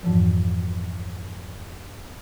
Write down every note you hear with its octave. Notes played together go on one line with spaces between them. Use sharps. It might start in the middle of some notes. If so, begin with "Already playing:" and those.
F2 G#2 E3 F3